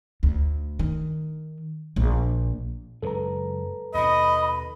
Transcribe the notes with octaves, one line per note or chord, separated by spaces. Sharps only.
D2
D#3
A#1
F#1 F#2 G#3 A4 B4 A#5
D#2 B2 D#5 B5